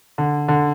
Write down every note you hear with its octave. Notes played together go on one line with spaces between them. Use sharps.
D3
D3